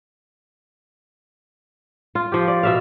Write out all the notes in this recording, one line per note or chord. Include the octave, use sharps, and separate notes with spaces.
F4
F3 G4
D5
B2 E5 F5